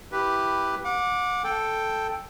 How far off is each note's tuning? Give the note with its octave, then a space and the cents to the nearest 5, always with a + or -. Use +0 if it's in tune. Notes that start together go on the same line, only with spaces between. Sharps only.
E4 +0 G4 +0 B4 +0
F#5 -35 D6 +0
A4 +0 G5 +5